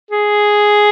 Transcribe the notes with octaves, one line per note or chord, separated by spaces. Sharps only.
G#4